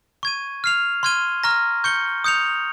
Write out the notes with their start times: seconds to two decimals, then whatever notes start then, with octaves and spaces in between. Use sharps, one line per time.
0.23 C#6 G#6 D#7
0.64 F6 C7 F7
1.03 C6 F6 G#6 D#7 G7
1.44 A#5 C#6 F6 A#6
1.84 C#6 G6 C#7 G7
2.24 D#6 G6 C#7 F7